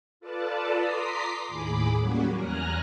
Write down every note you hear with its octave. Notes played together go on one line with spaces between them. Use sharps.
F4 A4 B4 D5 A5
A#5 C6 D6 D#6 B6 C7
D#2 A2 G#4 B5 D6
F#3 G3 A#3 C#4 F#4
E2 G#5 A#5 F6 F#6 A#6